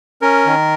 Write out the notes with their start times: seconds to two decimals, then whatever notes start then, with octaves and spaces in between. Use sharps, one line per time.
0.22 C#4 A#4
0.46 D#3